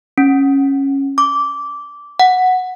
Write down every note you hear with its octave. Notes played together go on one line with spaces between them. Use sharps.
C#4
D6
F#5